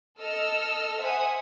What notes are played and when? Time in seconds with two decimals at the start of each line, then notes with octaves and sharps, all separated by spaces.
0.19 A4 D#5 E6 F6
1.01 C5 E5 F#5 G#5 D#6